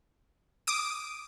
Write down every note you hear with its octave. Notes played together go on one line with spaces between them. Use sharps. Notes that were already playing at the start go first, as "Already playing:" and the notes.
D6 D#6 D7